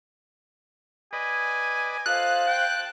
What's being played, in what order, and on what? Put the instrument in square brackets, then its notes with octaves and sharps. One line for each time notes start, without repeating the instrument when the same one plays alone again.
[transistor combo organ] B4 D5 D#5 [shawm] G#5
[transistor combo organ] F4 A4 D#5 [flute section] C5 F5 [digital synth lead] F#6
[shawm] G5 [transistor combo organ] A5